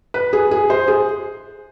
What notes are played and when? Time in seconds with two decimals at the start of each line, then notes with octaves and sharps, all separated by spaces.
0.14 B4
0.33 G#4
0.51 G#4
0.70 C5
0.88 G#4